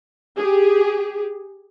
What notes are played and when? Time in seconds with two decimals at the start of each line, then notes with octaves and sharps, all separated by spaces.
0.37 G4 G#4